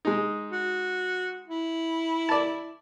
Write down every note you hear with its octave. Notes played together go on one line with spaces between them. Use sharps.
G#3 D#4
F#4
E4
D5 A5